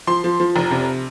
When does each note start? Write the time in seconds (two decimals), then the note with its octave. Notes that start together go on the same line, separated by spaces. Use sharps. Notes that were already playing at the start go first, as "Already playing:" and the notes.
0.07 F3 C6
0.24 F3
0.40 F3
0.56 F1
0.71 C3